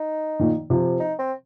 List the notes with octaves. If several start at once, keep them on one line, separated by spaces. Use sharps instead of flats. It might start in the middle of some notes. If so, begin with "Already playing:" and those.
Already playing: D#4
A#2 D#3
C3 F3
D#4
C4